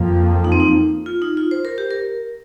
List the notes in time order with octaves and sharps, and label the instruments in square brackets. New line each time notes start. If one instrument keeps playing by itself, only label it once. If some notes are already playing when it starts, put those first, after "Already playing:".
Already playing: [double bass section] F2 F3 A#3
[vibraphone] D#4
C4
D#4
F4
D#4
F4
C5
A#4
G4
A#4